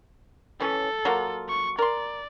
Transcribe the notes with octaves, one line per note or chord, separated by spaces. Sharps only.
E3 C#4 A4
F#3 A#3 F4
C#6
A#4 D5 C6